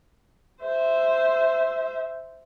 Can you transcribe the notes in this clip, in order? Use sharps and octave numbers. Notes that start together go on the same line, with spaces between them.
C5 E5